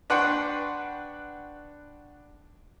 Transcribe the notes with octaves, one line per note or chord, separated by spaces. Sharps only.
D4 B4 F#5 G5 C6 C#6